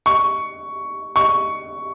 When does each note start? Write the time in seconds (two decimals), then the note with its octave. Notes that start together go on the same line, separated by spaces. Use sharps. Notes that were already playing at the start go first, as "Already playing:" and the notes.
0.06 C#6
1.16 C#6